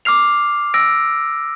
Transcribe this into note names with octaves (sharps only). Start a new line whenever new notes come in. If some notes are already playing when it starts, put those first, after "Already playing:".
D6 F6 C7 F7
E6 A#6 D7